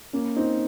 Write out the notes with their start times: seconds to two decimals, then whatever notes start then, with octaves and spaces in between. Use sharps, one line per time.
0.13 A#3 C#4
0.36 C4 D#4